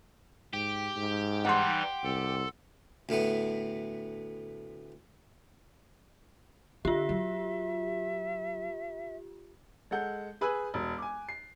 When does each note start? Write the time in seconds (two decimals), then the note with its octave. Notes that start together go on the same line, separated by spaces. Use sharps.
0.53 G#2 G4
0.96 G#2
1.45 E3 G3 D#4 F#5 C6
2.04 C2 A4
3.09 D2 A2 A3 B3
6.85 D3 F4 G4 E5
7.09 F#3
9.91 G#3 A4 F#5 G6
10.41 G#4 B4 G#5 E6 F#6
10.74 E1
10.98 G#5 D6
11.29 C7